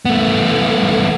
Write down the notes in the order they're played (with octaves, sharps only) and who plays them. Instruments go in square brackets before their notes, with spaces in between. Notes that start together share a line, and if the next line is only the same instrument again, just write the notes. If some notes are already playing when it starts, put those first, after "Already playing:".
[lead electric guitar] A3 B3